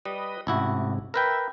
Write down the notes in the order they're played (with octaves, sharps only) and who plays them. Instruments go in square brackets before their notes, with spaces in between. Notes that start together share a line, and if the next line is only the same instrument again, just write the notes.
[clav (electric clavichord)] G3 [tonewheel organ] B4 D#5
[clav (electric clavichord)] A1 E4 F#4 [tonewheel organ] G#2 C3
[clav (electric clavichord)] A#4 B4 G5 [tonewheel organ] E5